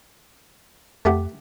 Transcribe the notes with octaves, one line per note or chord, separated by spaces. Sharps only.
F2 A3 G4 F#5